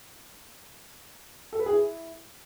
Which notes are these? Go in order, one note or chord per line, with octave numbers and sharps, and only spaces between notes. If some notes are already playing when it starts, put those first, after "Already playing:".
A4
B4
G#4
E4